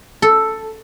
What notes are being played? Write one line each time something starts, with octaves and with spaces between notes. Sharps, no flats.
A4